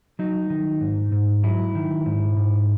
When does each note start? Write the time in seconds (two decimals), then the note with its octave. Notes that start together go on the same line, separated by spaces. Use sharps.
0.19 F#3 D#4
0.50 D#3
0.81 G#2
1.12 G#2
1.43 F#3 E4
1.75 D#3
2.06 G#2
2.37 G#2